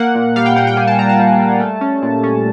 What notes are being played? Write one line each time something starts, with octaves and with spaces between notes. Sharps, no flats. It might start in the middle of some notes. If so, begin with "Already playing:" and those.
Already playing: A#3 F#5
A#2
G3 F5
G5
A#3 F#5
G5
G3 G#5
A5
A#2 A#5
A5
G3
G3
A3
C#4
A#2
C#4